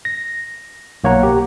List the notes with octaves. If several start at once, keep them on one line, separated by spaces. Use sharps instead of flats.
A#6
B1 A#3 C#5 F#5 A#5
G4